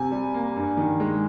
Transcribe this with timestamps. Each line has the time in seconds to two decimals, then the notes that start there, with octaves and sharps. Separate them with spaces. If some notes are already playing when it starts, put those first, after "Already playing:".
Already playing: C3 G#5
0.11 G3
0.34 A#3
0.56 G2
0.77 D#3
1.00 G#3